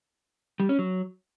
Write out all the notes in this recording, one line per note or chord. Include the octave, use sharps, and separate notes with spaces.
G3
C#4
F#3